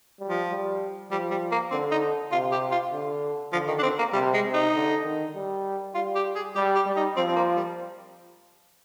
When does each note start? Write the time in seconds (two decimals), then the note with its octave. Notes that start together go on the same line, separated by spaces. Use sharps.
0.20 G3
0.30 F3
0.50 G3
1.11 F3 G3
1.31 G3
1.52 A#3
1.71 D3 C4
1.91 D#4
2.32 C3 F4
2.52 G4
2.72 F4
2.92 D3
3.53 D3 F3
3.68 D#3
3.79 D4
3.83 C4
3.99 A#3
4.13 C3 G3
4.34 G#3
4.44 C3
4.54 D#4
4.74 D3
5.04 D#3
5.35 G3
5.95 G3 F4
6.15 G4
6.36 G#4
6.56 G3 G4
6.75 G4
6.86 G3
6.97 D#4
7.16 F3 C4
7.29 C4
7.36 A#3
7.57 G3